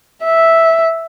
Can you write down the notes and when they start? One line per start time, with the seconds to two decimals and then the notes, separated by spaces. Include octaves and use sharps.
0.24 E5